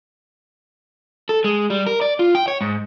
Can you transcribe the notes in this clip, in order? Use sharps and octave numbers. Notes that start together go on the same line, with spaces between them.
A4
G#3
G3
A#4
D5
F4
G5
C#5
G#2